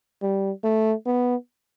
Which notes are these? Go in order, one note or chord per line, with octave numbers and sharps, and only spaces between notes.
G3
A3
B3